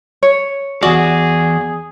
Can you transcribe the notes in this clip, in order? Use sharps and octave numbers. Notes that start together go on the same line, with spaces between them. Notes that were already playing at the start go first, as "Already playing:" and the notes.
C#5
E2 F#4 G#4 D5